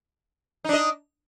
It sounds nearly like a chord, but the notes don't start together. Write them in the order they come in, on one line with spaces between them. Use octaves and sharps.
D#4 D4 D#5